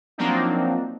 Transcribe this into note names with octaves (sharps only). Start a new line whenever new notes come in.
F3 F#3 A#3 C4 D4 D#4